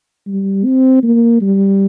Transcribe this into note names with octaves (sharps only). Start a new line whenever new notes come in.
G3
C4
A#3
G3